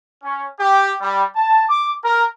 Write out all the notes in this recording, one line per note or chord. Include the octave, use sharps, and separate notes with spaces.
C#4
G4
G3
A5
D6
A#4